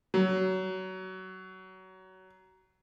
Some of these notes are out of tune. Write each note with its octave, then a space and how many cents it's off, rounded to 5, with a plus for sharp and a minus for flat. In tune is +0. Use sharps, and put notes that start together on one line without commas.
F#3 +20